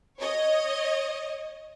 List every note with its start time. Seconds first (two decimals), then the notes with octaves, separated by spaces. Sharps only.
0.18 C#5 D#5